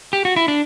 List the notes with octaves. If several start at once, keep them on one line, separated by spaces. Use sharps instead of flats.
G4
F#4
E4
D4